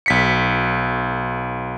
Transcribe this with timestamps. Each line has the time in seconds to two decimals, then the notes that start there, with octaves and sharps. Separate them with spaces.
0.06 B1 B6 C#7